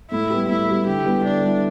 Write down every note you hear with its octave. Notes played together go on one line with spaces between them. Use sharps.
A2 E4
G3 B3 G4
A2 E4
G3 B3 G4
D3 G4
G3 B3 E4
D3 D4
G3 B3 E4